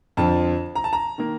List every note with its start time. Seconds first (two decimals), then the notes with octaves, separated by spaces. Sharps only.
0.17 F2 D3 F3 A5
0.75 A#5
0.84 A5
0.93 A#5
1.18 D#3 A#3